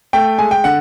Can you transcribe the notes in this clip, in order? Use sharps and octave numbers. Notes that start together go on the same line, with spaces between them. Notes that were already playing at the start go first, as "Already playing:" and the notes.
A3 G5
G#3 G#5
G5
D3 F#5